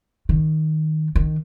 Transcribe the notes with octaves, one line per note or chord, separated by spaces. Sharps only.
D#3
D#3